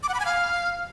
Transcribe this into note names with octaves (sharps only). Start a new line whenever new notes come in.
D6
F#5
B5
G#5
F5